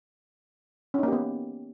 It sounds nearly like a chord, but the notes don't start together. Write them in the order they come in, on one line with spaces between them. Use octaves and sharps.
C#4 D#4 A#3 G4 B3